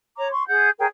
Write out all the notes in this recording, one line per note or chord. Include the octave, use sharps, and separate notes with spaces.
C#5 A#5 D6
C6 C#6
G#4 F#5 G6
G#4 A#4 C#5 G5